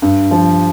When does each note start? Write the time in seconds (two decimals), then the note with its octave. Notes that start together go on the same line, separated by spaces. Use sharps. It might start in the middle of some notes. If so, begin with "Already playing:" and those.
0.02 G2
0.31 F3